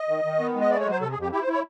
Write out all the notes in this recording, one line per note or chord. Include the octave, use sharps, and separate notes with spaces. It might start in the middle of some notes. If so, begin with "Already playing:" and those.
Already playing: D#5
D#3
D#3
B3
G#3
D#5
A3 D5
C#5
F#3 C5
C3 A4
G#4
F2
G4
E4 G4
C5
E4
C#5